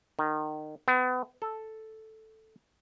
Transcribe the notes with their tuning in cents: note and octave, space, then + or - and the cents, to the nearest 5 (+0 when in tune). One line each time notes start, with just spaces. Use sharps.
D#3 -25
B3 +35
A4 +0